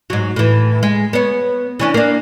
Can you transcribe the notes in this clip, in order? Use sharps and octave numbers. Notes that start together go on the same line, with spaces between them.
G#2 F#3
A2 E3
G#3
B3 C#5
E3 C#4 D4
A#3 D4